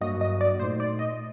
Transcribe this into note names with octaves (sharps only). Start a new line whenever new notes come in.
G2 F#3 A#3 F#4 D#5
D#5
D5
A#2 A3 D#4 C5
D5
D#5